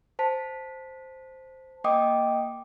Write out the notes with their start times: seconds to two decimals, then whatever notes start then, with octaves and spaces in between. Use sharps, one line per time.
0.19 C5 A5 B6
1.84 A#3 D#5 G5 D6 D#6